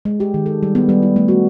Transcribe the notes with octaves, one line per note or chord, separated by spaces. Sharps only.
G#3
G4
D#3
A4
G3
B3
G3
E4
A3
F#4